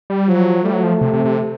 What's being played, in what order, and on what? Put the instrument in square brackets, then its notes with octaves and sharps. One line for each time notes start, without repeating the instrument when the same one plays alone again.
[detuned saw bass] G3
[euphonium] F3 [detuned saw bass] F#3
[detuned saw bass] G3 [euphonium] A3
[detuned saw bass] F#3
F3
C3
C3
C3